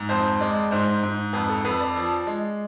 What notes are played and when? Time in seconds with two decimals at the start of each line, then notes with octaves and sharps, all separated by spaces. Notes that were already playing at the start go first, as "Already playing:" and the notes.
Already playing: G#2
0.09 F2 C5
0.40 G#3 D5
0.71 G#2 C5
1.03 G#2
1.33 F2 B4
1.49 A4
1.64 F2 B4
1.80 D5
1.96 F3
2.27 G#3